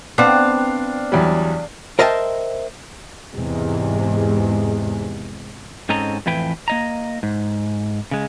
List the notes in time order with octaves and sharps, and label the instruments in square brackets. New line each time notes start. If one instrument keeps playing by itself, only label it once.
[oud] B3 C4 [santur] D4 F5
[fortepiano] E2 F#3 G3
[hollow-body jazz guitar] A#4 C5 D#5 E5 G5 A5
[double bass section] E2 G#2 C3 G#3
[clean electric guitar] G#2 C4 C#4 A4 D#5 A#5
F2 A2 E3 B4 G5
A#3 D#5 A#5
G#2
C#3 G#3